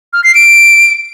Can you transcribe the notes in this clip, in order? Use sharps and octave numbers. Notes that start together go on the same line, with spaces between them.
F6
C7
D7